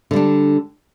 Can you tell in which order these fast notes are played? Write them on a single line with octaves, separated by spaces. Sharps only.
D3 G3 D4